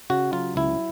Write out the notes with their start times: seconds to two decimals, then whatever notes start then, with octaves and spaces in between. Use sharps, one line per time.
0.10 C#3 F#4
0.33 F#3 F4
0.56 C#2 E4